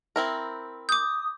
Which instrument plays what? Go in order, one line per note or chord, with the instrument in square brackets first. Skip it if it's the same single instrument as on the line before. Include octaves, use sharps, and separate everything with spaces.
[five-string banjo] C4 E4 A#4
[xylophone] D6 G6 [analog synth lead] D#6